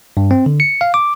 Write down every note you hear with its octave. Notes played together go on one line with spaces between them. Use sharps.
G2
C4
D3
C#7
F5
D6